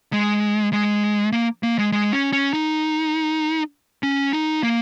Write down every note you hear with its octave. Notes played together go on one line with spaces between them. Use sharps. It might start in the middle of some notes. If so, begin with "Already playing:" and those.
G#3
G#3
A#3
A#3
G#3
G#3
C#4
C#4
D#4
C#4
D#4
A#3